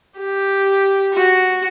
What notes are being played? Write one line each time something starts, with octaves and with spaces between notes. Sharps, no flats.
G4
F#4